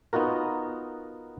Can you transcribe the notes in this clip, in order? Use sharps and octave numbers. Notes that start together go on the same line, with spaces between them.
B3 D#4 F4 F#4 A#4